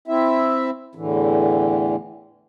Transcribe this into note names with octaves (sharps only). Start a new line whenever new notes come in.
C4 E4 E5
E2 A2 D3 E3